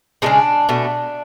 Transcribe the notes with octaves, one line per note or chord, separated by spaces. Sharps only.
C#3 E3 G#3 D4
B2 A3